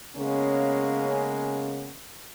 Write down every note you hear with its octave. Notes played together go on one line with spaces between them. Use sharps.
C#3 G#3 A#3 B3 C#4